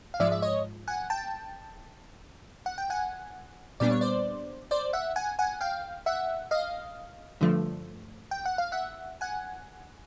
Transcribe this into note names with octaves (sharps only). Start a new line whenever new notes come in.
F5
G#2 F3 G#3 D5 E5
E5
C#5 D#5
F#5 G#5
G5 A5
F#5
G5
F#5 G#5
A#2 G3 B3 D4 D5
C#5
C5 D5
C5 D5
E5 F#5
F#5 G#5
F#5 G#5
F5 G5
E5 F#5
D#5 F5
G2 D3 F3 A3
G5
F#5
F5
E5 F#5
F#5 G#5